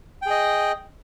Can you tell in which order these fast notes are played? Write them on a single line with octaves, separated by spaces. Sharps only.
G5 G#4 D#5